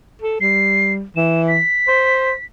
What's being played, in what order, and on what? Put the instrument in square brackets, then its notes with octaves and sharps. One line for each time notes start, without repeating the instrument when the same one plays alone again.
[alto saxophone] A4
[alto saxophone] G3 [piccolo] C7
[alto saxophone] E3 [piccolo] E7
[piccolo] B6
[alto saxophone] C5